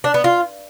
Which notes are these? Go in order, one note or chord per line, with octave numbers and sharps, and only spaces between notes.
D4
B3
F4